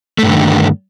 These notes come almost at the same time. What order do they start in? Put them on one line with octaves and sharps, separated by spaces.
A3 G2 D3 D#3